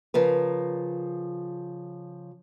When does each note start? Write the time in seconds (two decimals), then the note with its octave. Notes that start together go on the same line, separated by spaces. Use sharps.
0.14 C#3 F3 A#4 B4